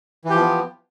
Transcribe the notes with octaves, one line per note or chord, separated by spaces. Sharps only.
E3 F3 B3 G4